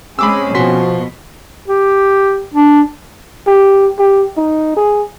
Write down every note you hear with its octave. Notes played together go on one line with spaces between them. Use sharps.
G#3 C4 C#4 G#4 B5 D6 E6
B2 F3 F#4 C6 B6
G4
D4
G4
G4
D#4
G#4